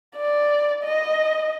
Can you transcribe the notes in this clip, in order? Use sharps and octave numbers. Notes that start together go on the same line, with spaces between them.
D5
D#5